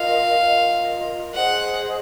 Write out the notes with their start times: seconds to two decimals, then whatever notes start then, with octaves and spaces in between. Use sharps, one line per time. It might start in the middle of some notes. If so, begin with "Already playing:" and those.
Already playing: F4 A#4 D#5 F5
0.40 F4 A#4 D#5
1.35 G#4 C5 D#5 F#5